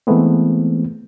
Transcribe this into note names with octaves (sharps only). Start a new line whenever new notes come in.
E3 G#3 A3 B3 C4